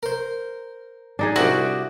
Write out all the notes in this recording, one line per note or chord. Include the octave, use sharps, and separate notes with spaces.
A#4 C5
D4 D#4 G#4
C2 F#4 C5 D5 E5 G#5